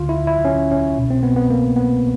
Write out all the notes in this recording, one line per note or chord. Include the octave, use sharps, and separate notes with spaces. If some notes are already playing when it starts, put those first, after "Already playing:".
Already playing: D2 D3 F4
E4
E4
C#4
C#4
C2 B2
C4
B3
B3
A#3
B3